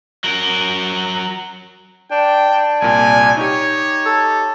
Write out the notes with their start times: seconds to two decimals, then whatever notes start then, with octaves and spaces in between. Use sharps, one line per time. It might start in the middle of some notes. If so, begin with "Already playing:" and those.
0.24 F#3 A#4
2.11 D4 G5
2.49 D4
2.82 C2 A#2 G#5
3.37 D#4 G4 C#5
4.06 A4